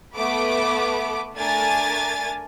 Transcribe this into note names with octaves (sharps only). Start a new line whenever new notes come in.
A3 B3 B4 D6
A3 D4 A#4 G#5 A6